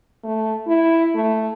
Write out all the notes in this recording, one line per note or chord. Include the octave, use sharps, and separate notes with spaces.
A3
E4
A3